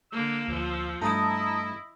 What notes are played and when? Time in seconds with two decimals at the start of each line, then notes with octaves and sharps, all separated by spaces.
0.12 D3 A#3 E6
0.48 D2 F3
1.02 G2 A3 E4 D#5 A5 A#5 D#6